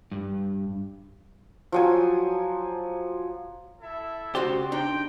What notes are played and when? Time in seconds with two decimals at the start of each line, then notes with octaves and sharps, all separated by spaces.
0.12 G2
1.72 F3 F#3 G#5
3.81 E4 A4 E5
4.35 C#3 C4 F#4 G4 C5 D5 C6
4.72 D4 D#4 G5